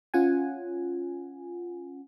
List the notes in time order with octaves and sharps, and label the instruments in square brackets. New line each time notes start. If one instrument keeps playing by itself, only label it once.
[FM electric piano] C#4 F4 F#5 G#5